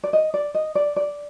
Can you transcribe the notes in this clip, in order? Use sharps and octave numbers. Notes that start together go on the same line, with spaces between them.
D5
D#5
D5
D#5
D5
D5